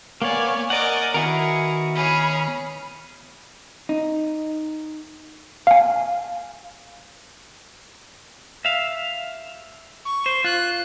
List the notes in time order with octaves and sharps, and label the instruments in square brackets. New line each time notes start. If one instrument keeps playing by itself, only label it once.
[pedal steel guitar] A#3 B3 D5 [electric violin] C#5 G#5
[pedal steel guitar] A#4 F#5 [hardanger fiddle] D5 D#5 [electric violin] G#5
[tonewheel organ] D#3 B3 [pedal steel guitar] E4 F#4 A#4 [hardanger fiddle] G#4
[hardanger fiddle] G#4 C#5 [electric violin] B5 F6
[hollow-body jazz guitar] D#4
[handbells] F5 G#5
[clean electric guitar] E5 F5
[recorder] C#6
[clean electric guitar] C5
[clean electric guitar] F4 [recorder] F#6